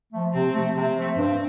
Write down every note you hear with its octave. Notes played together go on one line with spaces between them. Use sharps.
F3 A3
C3 C4
F3 A3
C3 C4
F3 A3
G2 C4